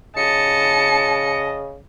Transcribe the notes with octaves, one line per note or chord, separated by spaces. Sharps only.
C#3 D#5 A5 C#7